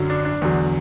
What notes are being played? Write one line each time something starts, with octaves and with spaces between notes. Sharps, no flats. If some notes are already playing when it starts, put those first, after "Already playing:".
Already playing: F#2 D3 F#3
D4
D4
E2 D3 F#3